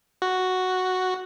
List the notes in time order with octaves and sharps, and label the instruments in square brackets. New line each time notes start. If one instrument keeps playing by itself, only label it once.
[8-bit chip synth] F#4